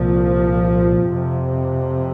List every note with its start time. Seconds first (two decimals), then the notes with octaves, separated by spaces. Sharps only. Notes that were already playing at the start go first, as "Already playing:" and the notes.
Already playing: C2 A#2 F3
1.08 F2 C3